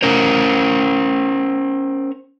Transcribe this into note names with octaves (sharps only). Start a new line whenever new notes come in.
C#4 A#4 C5